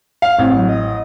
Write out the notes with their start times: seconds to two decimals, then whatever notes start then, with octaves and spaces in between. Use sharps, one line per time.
0.22 F5
0.38 A1 C4
0.57 F#3
0.69 D#5